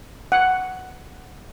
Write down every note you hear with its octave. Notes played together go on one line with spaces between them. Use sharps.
F#5